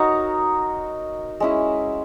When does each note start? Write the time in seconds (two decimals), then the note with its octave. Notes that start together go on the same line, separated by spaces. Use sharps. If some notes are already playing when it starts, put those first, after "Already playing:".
Already playing: D#4 F#4 A#4 C#5
1.40 G#3 C#4 E4